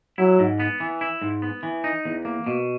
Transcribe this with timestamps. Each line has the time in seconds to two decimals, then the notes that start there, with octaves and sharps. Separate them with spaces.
0.18 F#3 E4
0.39 G#2
0.60 B3
0.80 E3
1.01 E4
1.22 G#2
1.42 B3
1.63 E3
1.84 D#4
2.05 E2
2.25 A#3
2.46 B2